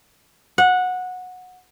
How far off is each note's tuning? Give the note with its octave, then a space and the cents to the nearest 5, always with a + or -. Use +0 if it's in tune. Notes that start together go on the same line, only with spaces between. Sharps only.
F#5 -15